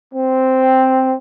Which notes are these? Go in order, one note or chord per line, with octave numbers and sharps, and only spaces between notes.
C4